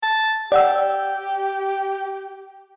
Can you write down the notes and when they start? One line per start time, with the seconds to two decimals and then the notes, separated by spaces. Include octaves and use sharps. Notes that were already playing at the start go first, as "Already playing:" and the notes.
0.03 A5
0.52 G4 D5 F#5 E6